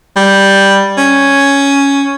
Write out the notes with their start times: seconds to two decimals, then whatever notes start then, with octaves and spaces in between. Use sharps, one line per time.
0.16 G3
0.98 C#4